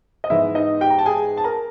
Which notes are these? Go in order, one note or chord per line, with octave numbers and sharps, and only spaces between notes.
D#5
G#2 E3 G#3 B3 E4 E5
D#4 D#5
G4 G5
A#5
A5
G#4 G#5
A5
A#4 A#5